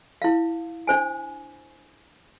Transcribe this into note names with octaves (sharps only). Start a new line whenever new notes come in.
E4 F5
D4 C5 G#5